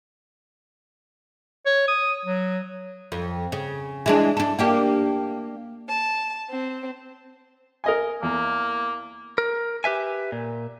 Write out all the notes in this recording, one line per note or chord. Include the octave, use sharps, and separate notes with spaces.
C#5
D#6
F#3
F2
C#3
E3 G#3 D4
D4 A4
A#3 D4 G4
A5
C4
A#4 D#5 G#5
E2 A#3
A#4
G4 B4 E5 G#5
A#2